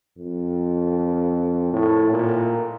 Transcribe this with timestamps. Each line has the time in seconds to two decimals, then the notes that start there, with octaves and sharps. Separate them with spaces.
0.18 F2
1.73 A2
2.11 A#2